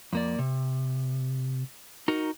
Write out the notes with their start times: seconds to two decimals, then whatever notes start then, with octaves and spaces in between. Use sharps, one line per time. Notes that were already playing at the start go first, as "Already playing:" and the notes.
0.13 F2 A#3 D5
0.39 C3
2.08 D#4 F#4 A#4